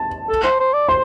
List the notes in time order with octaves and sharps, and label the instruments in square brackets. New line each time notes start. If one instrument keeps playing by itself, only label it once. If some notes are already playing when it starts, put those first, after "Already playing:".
Already playing: [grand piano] A5
[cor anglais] A4
C5
C5
D5
[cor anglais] C5 [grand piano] C6